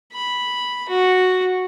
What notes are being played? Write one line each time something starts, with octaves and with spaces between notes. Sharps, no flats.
B5
F#4